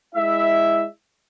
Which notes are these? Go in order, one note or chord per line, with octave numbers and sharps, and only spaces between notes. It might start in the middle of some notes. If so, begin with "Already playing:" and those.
G#3 E4 E5